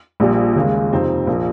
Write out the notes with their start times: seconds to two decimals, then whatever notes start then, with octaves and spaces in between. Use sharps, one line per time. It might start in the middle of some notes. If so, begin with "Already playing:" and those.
0.20 A#1 A#2 G3
0.56 D#2 C#3 G#3
0.92 F2 C3 F3 C4 D#4
1.27 A#1 F3 A#3